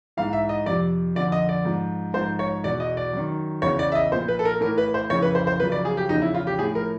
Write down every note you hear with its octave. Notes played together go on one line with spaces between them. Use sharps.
G#2 E3 F5
E5
D#5
F2 C3 F3 D5
F2 D3 F3 D5
D#5
D5
G#2 F3
G#2 F3 C5
C#5
E2 B2 D5
D#5
D5
F#2 D#3
E2 C#3 E3 C#5
D5
E5
D#5
A#2 F3 C5
B4
A4
A#4
A2 E3 A#4
B4
C5
F2 C#3 E3 C#5
B4
C5
C5
F#2 C#3 F3 B4
D5
G#4
G4
E2 C#3 F3 D#4
E4
F4
G4
A2 F3 G#4
A#4